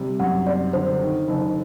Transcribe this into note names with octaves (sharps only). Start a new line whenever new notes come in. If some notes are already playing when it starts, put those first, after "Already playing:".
Already playing: C3 G3
F#2 F#5
C4 D5
D3 C5
D#3
F#1